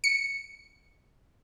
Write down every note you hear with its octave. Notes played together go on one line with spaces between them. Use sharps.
C#7